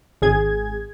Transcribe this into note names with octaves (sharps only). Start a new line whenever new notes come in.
G#1 G#4 G#6